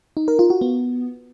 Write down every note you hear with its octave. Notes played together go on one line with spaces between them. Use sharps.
D#4
A#4
F4
F#4
B3